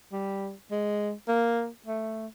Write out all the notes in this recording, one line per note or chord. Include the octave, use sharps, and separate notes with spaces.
G3
G#3
A#3
A3